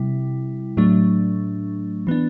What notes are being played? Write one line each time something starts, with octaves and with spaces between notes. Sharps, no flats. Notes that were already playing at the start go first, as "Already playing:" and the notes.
Already playing: C3 G3 E4
A2 F#3 A3 D4
E3 B3 D4